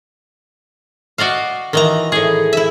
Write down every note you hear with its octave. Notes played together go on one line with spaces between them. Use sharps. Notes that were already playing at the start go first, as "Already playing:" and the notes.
F#4 D5 D#5 F5
D#3 E3 A#5
A2 G#4
E4 E5